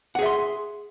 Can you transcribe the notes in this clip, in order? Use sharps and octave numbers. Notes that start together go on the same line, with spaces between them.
G#4 E5 F#5 C6